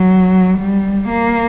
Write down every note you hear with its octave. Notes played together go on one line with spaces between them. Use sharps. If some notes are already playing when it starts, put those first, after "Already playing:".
Already playing: F#3
G3
A#3